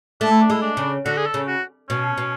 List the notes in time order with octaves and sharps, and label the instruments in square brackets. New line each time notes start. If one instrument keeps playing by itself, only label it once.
[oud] A3 [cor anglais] D4
[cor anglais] E4
D4
[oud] G#3 [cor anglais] E4
[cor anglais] D4
[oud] C#3
[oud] D3 [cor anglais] F#4
[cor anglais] G#4
A4
[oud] C#3
[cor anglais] F#4
[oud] B2 [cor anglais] C#4
[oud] B2